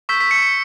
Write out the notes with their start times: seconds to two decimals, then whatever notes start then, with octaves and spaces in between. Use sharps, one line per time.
0.09 C#6 E6 G6 B6
0.21 B6
0.31 C#7
0.43 C#7